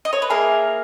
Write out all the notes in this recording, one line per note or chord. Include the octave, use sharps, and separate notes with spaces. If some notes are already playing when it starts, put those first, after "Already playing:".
D#5
C#5
B4
A#3 E4 G#4 A#4